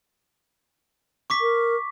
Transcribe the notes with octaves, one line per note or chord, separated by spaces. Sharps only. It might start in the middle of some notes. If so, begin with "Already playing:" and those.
C#6 D6 B6
A#4